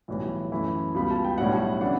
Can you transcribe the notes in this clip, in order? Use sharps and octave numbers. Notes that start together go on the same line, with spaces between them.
B1 A2 E3 G3
F#2 E3 A3 E4
C#2 B2 G3 B3 B5
A5
G5
B1 A2 G3 D4 F#5
C#3 E3 B3 D4 F#5